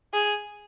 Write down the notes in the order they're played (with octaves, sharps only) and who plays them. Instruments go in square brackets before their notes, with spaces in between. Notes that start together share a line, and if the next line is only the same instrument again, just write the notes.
[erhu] G#4